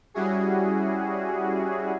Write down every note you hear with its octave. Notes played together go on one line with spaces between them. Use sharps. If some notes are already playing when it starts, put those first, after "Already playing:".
G3 C#4 E4 F#4 G#4